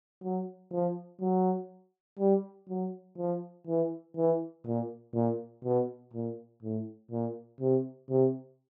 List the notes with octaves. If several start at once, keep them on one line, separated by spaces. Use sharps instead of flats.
F#3
F3
F#3
G3
F#3
F3
E3
E3
A#2
A#2
B2
A#2
A2
A#2
C3
C3